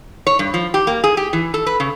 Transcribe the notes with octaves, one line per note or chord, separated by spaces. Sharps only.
C#5
G2
F3
G4
A#3
G#4
G4
E3
A4
B4
C#3